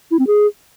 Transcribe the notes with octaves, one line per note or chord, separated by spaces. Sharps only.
E4
C4
G#4